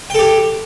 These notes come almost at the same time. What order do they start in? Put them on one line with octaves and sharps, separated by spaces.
G5 A4 G4